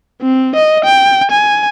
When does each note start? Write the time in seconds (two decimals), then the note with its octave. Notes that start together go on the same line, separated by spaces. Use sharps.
0.22 C4
0.56 D#5
0.84 G5
1.31 G#5